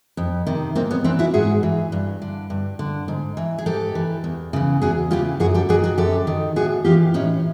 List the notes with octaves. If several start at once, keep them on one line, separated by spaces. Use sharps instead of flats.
F2
C3 D#3
G#2 A#3 C4
B3 C#4
E3 C4 D4
E4 F#4
G#2 F#4 G#4
E3
G2
D3
G2
D3
G#2
E3
G#4
G#2 G4 A4
E3
E2
C#3 E3
E2 F#4 G#4
C#3 E3 F4 G4
F#2 F#4 G#4
G4 A4
D#3 F#4 G#4
F#4 G#4
F#2 G4 A4
D#3
A2 F#4 G#4
E3 F4 G4
A2 C#4 D#4